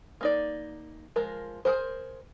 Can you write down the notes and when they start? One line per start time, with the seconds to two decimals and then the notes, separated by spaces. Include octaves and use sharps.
0.21 A#3 D#4 D5
1.16 F3 G#3 A#4
1.65 G#4 A#4 C5